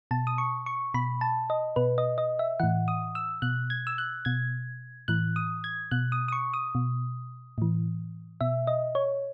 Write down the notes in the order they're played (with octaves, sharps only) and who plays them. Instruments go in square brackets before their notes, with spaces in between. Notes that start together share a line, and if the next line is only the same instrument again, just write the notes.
[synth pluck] B2 A5
D#6
C#6
C#6
B2 B5
A5
D#5
B2 B4
D#5
D#5
E5
A2 E3 F#5
D#6
E6
B2 F#6
G#6
E6
F#6
B2 G#6
A2 E3 F#6
D#6
G#6
B2 F#6
D#6
D#6
C#6
D#6
B2
A2 E3
B2 E5
D#5
C#5